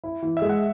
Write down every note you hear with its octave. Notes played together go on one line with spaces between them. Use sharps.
E4
E3
E5
G#3
F#5